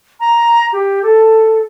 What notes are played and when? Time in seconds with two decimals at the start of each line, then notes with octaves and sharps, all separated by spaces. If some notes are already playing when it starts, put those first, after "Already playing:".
0.20 A#5
0.73 G4
1.03 A4